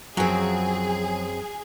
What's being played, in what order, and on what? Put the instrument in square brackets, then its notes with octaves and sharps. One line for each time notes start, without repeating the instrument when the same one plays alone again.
[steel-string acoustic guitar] F#2 C4 [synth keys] F3 F#3 [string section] G#4